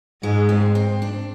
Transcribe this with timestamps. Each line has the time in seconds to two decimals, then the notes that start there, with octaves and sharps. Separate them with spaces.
0.23 G#2 G#3
0.49 C4
0.75 C4
1.02 D4